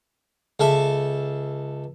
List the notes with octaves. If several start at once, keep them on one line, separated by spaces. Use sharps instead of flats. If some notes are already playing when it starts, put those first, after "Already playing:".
C#2 A4 E5